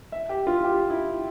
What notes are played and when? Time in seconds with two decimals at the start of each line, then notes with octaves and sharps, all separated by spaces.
0.12 E5
0.29 G4
0.47 F4
0.64 G4
0.90 E4